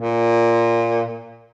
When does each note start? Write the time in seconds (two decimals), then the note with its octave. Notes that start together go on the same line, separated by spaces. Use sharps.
0.01 A#2